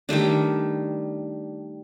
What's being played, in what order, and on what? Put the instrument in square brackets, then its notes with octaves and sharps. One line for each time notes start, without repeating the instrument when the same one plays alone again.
[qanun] D#3 G3 A3 D4